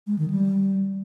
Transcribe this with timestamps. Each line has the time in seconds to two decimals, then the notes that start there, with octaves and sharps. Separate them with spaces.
0.07 G#3
0.19 D#3
0.30 G3